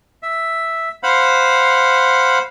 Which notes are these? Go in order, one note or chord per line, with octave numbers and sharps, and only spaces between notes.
E5
C5 F5 F#5 B5